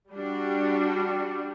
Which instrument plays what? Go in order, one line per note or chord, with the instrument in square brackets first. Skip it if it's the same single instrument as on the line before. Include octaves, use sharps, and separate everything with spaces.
[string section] G3 [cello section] D4 F#4